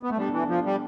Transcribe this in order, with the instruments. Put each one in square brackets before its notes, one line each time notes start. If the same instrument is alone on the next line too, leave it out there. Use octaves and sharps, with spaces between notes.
[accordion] B3
A3
[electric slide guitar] B2 B3 D4 A4 [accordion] G3
[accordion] E3
F3
G3